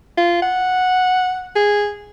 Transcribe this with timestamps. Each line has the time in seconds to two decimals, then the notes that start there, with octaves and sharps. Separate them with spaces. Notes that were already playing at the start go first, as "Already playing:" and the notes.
0.18 F4
0.42 F#5
1.56 G#4